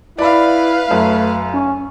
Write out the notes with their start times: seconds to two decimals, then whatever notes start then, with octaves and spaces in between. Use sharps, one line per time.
0.18 E4 B4 D5 F5 B5
0.91 F#2 A3
1.54 C#4